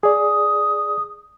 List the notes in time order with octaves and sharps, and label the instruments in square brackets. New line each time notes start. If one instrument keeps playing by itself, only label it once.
[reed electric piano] G#4 D5 [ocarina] D#6